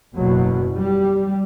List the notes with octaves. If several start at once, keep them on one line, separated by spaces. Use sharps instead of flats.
F#1 E2 B2 F#3
G3